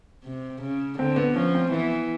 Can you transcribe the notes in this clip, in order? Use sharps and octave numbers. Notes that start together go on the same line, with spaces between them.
C3
C#3
D3 C4
B3
F3 C#4
C4
E3 B3